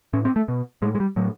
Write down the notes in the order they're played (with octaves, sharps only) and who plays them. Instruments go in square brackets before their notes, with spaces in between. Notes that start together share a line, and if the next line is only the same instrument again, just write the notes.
[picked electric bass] A2 C#4
C4
A3
B2
A2 G#3
G#3
G3
A2 F#3